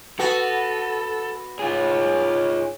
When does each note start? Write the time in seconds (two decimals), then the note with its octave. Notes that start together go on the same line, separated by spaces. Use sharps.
0.19 B3 F#4 A4
1.59 G#2 F4 G#4 C#5